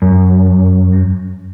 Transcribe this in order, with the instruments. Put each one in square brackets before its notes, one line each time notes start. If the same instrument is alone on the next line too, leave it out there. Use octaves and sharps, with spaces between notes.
[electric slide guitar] F#2